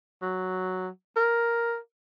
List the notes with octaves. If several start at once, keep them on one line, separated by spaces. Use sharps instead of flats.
F#3
A#4